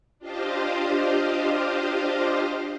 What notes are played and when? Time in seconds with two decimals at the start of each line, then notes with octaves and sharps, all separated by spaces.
0.19 D4 F4 G4 C5 D#5 F5